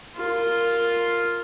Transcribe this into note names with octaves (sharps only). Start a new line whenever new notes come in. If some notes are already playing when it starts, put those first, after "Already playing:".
F4 A#4